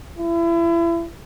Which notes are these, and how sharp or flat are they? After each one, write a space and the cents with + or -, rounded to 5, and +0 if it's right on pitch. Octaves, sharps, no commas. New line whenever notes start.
E4 +35